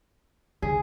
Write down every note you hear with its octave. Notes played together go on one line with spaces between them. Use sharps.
D3 G#4